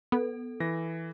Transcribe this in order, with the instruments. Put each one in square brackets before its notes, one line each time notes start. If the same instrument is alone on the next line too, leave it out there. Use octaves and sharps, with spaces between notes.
[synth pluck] B3 [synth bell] A4
[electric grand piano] E3 A#6